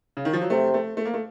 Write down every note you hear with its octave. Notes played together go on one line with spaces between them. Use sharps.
C#3
D#3
F3
F#3
C3 A3
A3
A3
A#3
A3